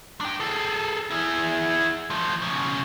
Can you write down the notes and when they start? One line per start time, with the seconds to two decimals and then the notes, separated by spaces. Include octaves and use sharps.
0.21 D4 G5
0.40 G#4 A4
1.11 E4 G#4
2.10 F3 A3
2.42 B1 C#3